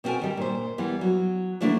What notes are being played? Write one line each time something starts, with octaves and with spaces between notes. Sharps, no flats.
B2 C4 E4 A4 A#4 G#5
D#3 G3
A#2 C5
E3 G3 B3
F#3
D3 F3 A3 A#3 D4 E4